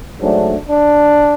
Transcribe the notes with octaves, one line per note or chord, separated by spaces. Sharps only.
G#2 F#3 A3 D4
D4